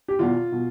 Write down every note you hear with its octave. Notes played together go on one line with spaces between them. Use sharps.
G4
E2 B2 F4
B2